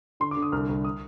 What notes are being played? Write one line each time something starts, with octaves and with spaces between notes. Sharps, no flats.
D3 C6
D6
D3
D#6
C2 F6
C2
D#6